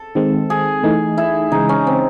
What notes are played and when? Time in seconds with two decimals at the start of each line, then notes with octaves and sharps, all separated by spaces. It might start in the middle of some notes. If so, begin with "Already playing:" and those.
Already playing: A4
0.15 D#3 G#3 C4
0.50 G#4
0.83 E3 A3 D#4
1.18 E4
1.52 C#3 E3 G#3 D#4
1.69 C#4
1.87 C4